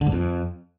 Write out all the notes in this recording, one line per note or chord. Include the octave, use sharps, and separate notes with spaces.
D3
G#2
F2